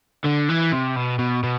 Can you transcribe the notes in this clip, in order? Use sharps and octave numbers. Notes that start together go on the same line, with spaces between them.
D3
E3
C3
B2
B2
B2